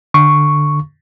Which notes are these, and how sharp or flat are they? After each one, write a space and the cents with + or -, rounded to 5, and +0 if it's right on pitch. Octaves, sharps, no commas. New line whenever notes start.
D3 +15 C#6 +0